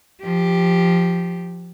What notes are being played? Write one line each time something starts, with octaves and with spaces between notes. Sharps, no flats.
F3 G4